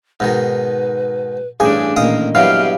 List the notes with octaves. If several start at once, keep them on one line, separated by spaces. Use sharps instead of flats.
G#2 B2 D#3 B4
A1 G2 C#4 D4 G#4 G#5 D6
A1 A#2 D#3 A#3 D#5 F5 D#6
G2 E3 F#3 B3 G4 G#4 F5